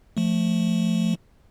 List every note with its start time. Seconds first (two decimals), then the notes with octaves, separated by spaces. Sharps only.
0.17 F3 A3